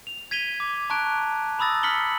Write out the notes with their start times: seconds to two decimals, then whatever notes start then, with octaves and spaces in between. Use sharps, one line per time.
0.07 F7
0.31 G#6 B6 D#7 F7 G7
0.60 D6
0.90 A5 A#5 C#6 F#6 D7
1.59 A#5 B5 D#6 E6 A6 A#6
1.83 F6 B6 C#7 F#7 G7